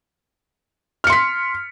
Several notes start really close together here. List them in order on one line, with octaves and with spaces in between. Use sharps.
F6 C#7 C6 B6